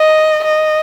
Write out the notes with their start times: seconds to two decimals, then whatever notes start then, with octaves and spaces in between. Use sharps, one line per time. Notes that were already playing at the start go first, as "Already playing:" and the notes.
Already playing: D#5
0.44 D#5